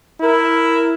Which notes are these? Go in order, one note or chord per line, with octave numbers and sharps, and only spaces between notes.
E4 A#4